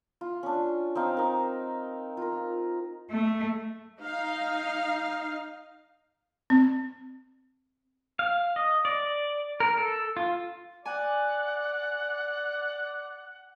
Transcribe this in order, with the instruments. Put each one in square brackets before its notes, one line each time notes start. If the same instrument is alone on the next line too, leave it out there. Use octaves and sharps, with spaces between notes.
[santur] F4
C#4 D4
C4 D#4 F5
D#4 A#4
F4 A#4
[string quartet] A3
[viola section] D#4 F5
[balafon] C4
[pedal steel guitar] F5
D#5
D5
A#4
A4
F4
[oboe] D5 [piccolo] F#5 [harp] G#5